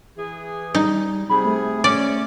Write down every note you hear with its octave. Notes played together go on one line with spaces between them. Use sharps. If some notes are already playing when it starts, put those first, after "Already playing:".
E3 G#4
G3 D#4
C3 G#4 B5
A3
C#4 D5